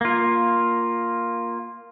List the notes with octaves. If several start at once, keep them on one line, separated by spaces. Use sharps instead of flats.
A#3 F4